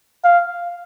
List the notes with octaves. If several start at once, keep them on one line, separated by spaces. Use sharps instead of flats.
F5